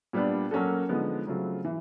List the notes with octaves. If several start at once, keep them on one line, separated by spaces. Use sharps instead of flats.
A#2 G3 B3 D4
F#3 A#3 C#4 F#4 A4
D3 F3 G#3 B3 D#4
C#3 F#3 A3 C4 F4
E3